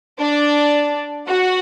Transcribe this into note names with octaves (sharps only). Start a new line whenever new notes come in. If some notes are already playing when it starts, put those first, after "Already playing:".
D4 D5
F#4 F#5